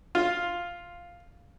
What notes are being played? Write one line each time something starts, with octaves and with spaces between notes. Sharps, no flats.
F4